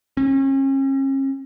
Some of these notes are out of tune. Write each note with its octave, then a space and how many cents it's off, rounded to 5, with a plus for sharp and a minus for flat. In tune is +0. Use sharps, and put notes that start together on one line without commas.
C#4 -40